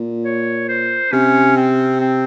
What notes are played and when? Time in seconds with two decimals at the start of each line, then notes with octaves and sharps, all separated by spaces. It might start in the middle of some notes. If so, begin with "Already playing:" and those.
Already playing: A#2
0.24 C#5
0.69 C5
1.12 C3 C#4
1.56 C4
2.00 C4